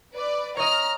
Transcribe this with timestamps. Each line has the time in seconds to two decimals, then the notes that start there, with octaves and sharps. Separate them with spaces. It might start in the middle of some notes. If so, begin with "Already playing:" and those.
0.14 B4 D5
0.57 C#5 D#5 A#5 F6